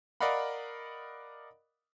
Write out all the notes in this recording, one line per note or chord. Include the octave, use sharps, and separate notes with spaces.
A#4 D5 D#5 F5 F#5 B5